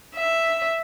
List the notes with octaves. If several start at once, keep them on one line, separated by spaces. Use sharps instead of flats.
E5